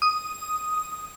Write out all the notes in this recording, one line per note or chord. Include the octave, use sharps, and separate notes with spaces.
D#6